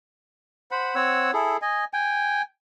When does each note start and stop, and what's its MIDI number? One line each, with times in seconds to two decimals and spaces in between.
0.71 0.95 72
0.71 0.95 78
0.71 0.95 83
0.95 1.31 60
0.95 1.31 73
0.95 1.31 78
0.95 1.31 88
1.33 1.57 64
1.33 1.57 68
1.33 1.57 69
1.62 1.84 75
1.62 1.84 80
1.93 2.42 79
1.93 2.42 80